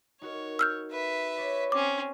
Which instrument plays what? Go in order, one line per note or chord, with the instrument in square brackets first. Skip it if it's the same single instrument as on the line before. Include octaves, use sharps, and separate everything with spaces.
[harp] D#4 F#4 A#4 [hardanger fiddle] C#5
[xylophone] E6 F6 G6
[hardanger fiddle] B4 E5
[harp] C#5 D5 A#6
[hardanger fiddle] C4 C#4 [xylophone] D6